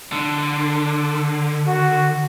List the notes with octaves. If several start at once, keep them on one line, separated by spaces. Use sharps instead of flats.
D3
F#4